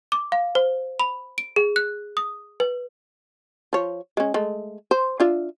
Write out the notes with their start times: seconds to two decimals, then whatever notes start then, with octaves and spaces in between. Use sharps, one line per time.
0.12 D6
0.32 F5
0.55 C5
1.00 B5
1.38 D7
1.56 G#4
1.76 F#6
2.17 D#6
2.60 B4
3.73 F3 C#5
4.17 G#3 C#4
4.34 G#3 A3
4.91 C5
5.20 D4 F4 E5